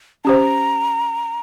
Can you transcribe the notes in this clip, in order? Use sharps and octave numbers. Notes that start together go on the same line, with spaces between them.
C#4 G4 C5 A#5